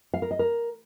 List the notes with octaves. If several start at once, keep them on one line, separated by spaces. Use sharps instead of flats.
F5
A#4
D#5
A#4